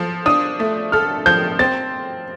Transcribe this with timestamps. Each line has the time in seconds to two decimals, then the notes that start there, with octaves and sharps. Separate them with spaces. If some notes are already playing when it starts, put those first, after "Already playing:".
Already playing: F3 A4
0.26 D4 D#6
0.60 A3
0.92 A4 F6
1.26 F3 G6
1.59 C4 A6